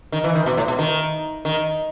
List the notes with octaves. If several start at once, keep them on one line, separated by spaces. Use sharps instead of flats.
D#3
E3
D#3
B2
A2
B2
D#3
D#3